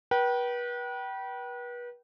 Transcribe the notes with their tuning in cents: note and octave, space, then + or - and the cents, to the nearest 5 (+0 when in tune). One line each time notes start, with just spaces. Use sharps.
B4 -35 G5 -30